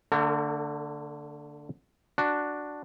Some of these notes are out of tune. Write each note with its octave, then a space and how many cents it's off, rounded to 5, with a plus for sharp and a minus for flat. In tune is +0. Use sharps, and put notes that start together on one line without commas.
D3 +0 A3 +40 A#4 -45
D4 +0 F#4 +0